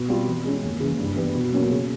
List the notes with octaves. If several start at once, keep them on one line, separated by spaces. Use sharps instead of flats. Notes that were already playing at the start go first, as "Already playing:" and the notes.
Already playing: B2
G3 C4 F4
E3
G#3 C#4
D#2
C#3 E3
G2
E3 G3 B3
B2
F#3 A#3 C#4
C#3